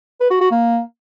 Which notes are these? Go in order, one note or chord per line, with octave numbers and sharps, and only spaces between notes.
B4
F#4
F#4
A#3